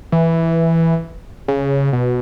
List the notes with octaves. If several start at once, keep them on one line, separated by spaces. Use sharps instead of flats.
E3
C#3
B2